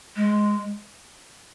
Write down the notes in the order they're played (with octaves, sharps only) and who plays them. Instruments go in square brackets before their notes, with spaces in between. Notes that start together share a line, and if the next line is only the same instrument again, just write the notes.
[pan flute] G#3